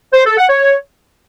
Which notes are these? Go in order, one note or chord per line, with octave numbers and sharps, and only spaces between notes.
C5
A4
F#5
C#5